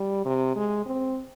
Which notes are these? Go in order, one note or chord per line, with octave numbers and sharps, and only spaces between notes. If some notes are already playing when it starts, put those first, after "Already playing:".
Already playing: G3
C3
G#3
C4